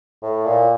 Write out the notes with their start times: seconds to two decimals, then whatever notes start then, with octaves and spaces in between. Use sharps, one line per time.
0.23 A2
0.46 A#2